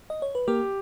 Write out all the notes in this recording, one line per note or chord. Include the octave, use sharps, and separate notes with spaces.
D#5
C#5
B4
A#3 G4 A#4